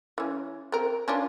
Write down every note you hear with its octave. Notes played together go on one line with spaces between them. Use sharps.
E3 C#4
C4 A#4
C#4 D4 F4